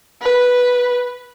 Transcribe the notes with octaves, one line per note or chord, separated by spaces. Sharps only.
B4